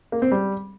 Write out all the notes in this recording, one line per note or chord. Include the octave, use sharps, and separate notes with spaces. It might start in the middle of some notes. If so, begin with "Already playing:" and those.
A#3
C4
G3